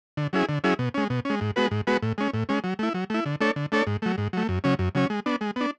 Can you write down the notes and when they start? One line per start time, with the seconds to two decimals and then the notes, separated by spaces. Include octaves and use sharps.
0.17 D3
0.33 F#3 C#4 E4 G#4
0.49 D3
0.64 F#3 C#4 E4 G#4
0.79 B2
0.94 G#3 C#4
1.10 B2
1.25 G#3 C#4
1.41 G#2
1.56 G#3 B3 F#4 B4
1.71 G#2
1.87 G#3 B3 F#4 B4
2.02 A2
2.18 G#3 C#4
2.34 A2
2.49 G#3 C#4
2.64 F#3
2.79 A3 E4
2.94 F#3
3.10 A3 E4
3.26 D3
3.41 A3 D4 A4 C#5
3.56 D3
3.72 A3 D4 A4 C#5
3.87 G#2
4.02 F#3 A3
4.18 G#2
4.33 F#3 A3
4.49 F#2
4.64 C#3 F#3 C#4
4.79 F#2
4.95 C#3 F#3 C#4
5.10 G#3
5.26 B3 D4
5.41 G#3
5.56 B3 D4